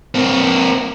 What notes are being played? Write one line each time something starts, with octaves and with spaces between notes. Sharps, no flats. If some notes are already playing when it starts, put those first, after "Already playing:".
A#3 C4